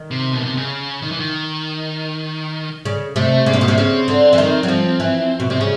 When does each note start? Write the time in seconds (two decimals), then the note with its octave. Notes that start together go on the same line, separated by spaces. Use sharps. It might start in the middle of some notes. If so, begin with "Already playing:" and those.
Already playing: D#3
0.11 C3
0.33 B2
0.46 C3
0.57 C#3
1.02 D#3
1.12 E3
1.20 D#3
2.85 C#3
3.16 C3 A3
3.46 C#3 A#3
3.53 C3
3.61 B2
3.68 C3
3.77 C#3 C4
4.08 D3
4.33 E3
4.38 D#3
4.63 F#3
4.68 F3
5.00 E3
5.40 B2
5.50 C3 C4
5.60 C#3 C#4